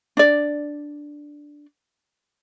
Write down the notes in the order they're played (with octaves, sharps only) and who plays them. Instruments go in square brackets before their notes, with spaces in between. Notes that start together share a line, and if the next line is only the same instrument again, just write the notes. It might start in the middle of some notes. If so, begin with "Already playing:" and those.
[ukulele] D4 D5